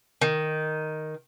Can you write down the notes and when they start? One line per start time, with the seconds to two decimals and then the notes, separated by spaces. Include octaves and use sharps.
0.21 D#3